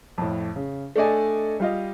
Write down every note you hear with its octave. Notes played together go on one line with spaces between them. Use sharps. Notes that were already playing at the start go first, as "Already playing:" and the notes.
F2 A2
C#3
A3 D4 A4 D5 D#5 G#5
G3 F4 D#5